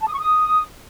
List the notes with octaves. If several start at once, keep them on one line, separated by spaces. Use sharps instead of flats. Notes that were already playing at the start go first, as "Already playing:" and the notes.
A5
D#6
C#6
D#6